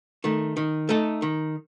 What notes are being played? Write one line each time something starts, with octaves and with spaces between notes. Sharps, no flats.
D#3 A3
D#3
A3 D#4 A4
D#3